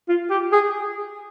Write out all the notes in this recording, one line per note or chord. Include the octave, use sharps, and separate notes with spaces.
F4
G4
G#4